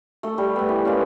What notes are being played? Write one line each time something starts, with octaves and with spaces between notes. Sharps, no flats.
A3 A4
G3
A3 B3
E3
G#3 A#3 C#4